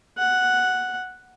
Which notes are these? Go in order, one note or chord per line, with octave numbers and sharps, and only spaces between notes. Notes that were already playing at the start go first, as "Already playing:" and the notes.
F#5